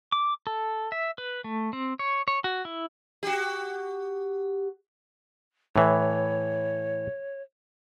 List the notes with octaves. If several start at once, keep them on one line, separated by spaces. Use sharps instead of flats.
D6
A4
E5
B4
A3
C4
C#5
C#5
F#4
E4
F#4 G4
A2 E3 C#5